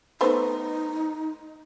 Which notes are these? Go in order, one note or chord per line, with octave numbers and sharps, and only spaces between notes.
A3 B3 D#4 C5